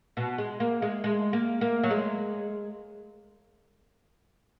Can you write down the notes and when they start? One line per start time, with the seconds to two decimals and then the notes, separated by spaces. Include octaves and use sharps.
0.17 B2
0.38 G#3
0.60 A#3
0.82 G#3
1.04 G#3
1.33 A#3
1.61 A#3
1.84 F#3
1.91 G#3